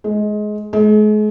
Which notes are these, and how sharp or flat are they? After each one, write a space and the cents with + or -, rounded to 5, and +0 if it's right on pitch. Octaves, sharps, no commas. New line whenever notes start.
G#3 +20
G#3 +40